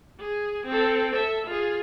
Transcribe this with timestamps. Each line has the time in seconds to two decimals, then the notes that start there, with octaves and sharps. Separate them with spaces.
0.20 G#4
0.67 C4 A4
1.12 A4 E5
1.46 F4 G#4